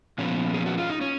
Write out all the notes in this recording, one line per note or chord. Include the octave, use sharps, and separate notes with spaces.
A#2 F3 B3 C#4
G#4
F#4
F4
D#4
C#4